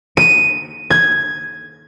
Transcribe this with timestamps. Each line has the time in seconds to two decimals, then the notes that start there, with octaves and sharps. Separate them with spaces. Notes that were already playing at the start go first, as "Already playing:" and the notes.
0.17 D#7
0.90 G#6